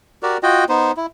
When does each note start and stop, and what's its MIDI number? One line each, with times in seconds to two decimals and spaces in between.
0.23 0.38 66
0.23 0.38 67
0.23 0.38 70
0.23 0.38 74
0.43 0.64 65
0.43 0.64 66
0.43 0.64 75
0.43 0.64 79
0.69 0.92 59
0.69 0.92 63
0.69 0.92 72
0.97 1.06 64